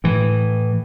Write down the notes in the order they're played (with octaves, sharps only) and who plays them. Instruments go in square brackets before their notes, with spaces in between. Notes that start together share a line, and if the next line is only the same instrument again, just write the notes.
[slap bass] A2 E3